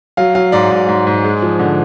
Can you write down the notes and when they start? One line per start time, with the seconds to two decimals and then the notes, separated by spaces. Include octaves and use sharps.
0.17 F#3 F5
0.35 F#3 F5
0.52 G#2 D5
0.71 G#2
0.88 G#2
1.07 G#2
1.24 G#3
1.42 F3
1.59 D3